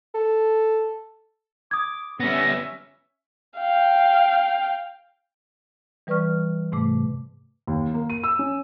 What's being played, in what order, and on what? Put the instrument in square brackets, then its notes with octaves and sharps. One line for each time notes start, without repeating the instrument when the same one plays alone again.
[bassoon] A4
[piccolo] D6 [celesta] D#6 G#6
[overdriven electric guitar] G3 B3 [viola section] C#4 E5 [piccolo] A#6
[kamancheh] F5 G5
[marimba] E3 G3 B4 D5 C#6 F6
G#2 C3 A3 D6
[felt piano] D#2
A#3
D#7
E6
C#4